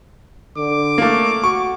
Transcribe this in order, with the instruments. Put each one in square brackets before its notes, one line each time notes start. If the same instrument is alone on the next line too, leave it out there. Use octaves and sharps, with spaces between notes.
[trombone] D3 [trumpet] D6
[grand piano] A3 A#3
[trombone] F#4 [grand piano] C#6